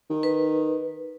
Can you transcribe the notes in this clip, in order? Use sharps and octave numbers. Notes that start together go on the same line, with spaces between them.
D#3
B4